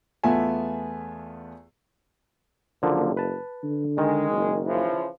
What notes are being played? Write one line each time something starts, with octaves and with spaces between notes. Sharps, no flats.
E2 A3 B3 F4 E5 G#5
F#1 D3 F3 A#3
B4 A5
D3
D#3 G#3
F#1
C#3 E3 F3